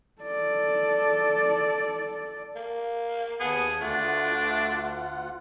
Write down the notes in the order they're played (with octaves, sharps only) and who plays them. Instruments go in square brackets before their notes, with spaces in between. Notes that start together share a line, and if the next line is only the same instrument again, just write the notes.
[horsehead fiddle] A4 D5
[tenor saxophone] A#3
[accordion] D#2 A5 [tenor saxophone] B3 [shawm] G#4
[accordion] D2 F4 F#5 [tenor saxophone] A3 [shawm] D4